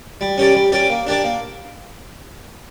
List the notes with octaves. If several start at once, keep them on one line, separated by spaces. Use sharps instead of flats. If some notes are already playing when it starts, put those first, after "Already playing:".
G3
C#4 G4 A#4 D5
G3
C#4 G4 A#4 D5
A#3
D4 G4 A#4 D5
A#3